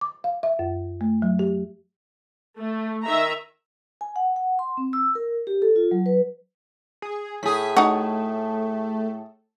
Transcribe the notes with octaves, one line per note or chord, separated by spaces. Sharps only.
D6
F5
E5
F#2
A3
F#3
G4
A3
D#3 E5 A#5
G#5
F#5
F#5
C6
C4
E6
A#4
G4
A4
F4
F#3
B4
G#4
A2 G#4 B6
A3 D#4 F#4